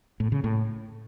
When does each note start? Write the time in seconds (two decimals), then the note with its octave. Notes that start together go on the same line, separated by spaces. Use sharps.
0.20 A2
0.32 C#3
0.44 A2